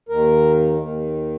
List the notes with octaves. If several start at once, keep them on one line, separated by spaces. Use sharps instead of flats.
D#2 D#3 A#4
D#2 D#3